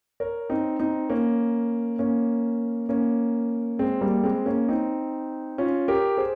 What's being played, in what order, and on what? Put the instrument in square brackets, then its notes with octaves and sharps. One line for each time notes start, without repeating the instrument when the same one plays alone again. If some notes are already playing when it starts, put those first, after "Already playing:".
[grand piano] A#4 C#5
C4 D#4
C4 D#4
A#3 C#4
A#3 C#4
A#3 C#4
G#3 C4
G3 A#3
G#3 C4
A#3 C#4
C4 D#4
C#4 F4
G4 A#4
G#4 C5